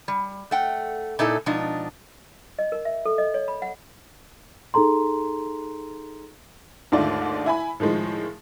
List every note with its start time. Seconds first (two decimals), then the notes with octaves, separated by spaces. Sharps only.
0.08 G3
0.51 A3 F#5 G5
1.19 A#2 D#4 E4 A4
1.46 B2 F3 G#3 D4 D#4
2.59 D#5
2.72 A#4
2.85 E5
3.05 A4
3.18 D#5
3.34 C#5
3.48 B5
3.62 F#5
4.74 D#4 G#4 A4 A#5 C6
6.92 D#2 G#2 D3 A3 F4 D5
7.46 E4 G#5 B5
7.80 A2 D#3 F3 G#3